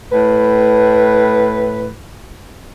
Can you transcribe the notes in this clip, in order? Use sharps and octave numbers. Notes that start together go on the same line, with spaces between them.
A2 B4